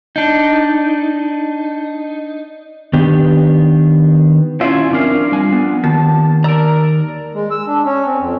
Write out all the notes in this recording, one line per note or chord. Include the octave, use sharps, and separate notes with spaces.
D4 D#4
D#3 B3 D4 G4
C#4 E4 F4 D5 E5 G#5
F3 C4 D4 A#4 F5
G3 G#5
B3
D#2 A5
A#4 D5 A#5 E6
G#3
E6
D4
C#4
C4
F2